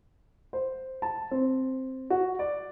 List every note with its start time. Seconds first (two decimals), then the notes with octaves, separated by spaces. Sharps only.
0.53 C5
1.02 A5
1.31 C4
2.10 F#4
2.39 D5